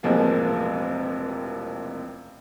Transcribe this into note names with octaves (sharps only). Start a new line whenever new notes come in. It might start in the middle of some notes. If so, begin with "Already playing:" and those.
E1 A1 C3 F3 A#3 G#4